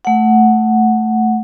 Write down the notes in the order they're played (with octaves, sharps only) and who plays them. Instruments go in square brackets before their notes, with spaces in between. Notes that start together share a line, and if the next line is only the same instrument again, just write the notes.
[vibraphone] A3 F#5